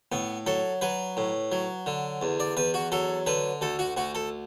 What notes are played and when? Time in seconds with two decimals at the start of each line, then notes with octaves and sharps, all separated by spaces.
0.12 A2 B3
0.47 F#3 A4
0.81 F#3 B4
1.17 A2
1.52 F#3
1.86 D3
2.22 E2
2.40 D5
2.57 E2 B4
2.74 F#4
2.92 F#3 A4
3.26 D3 B4
3.61 D2 A4
3.79 F#4
3.97 D2 F#4
4.15 A4